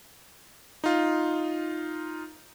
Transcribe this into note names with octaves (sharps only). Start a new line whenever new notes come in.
D#4 F4